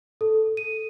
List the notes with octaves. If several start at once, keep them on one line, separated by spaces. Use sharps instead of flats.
A4
D#7